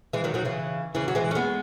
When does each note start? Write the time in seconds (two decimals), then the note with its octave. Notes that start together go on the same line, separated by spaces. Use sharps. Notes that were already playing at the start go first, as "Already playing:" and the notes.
0.13 E3 G#3
0.24 D#3 F#3
0.34 D#3 F#3
0.45 C#3 E3
0.95 C#3 E3
1.08 F#3
1.15 E3 G#3
1.31 C#4
1.35 G#3 B3